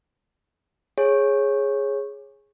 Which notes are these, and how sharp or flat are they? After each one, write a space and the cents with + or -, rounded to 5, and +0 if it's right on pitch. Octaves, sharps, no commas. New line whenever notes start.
G#4 +0 C#5 -15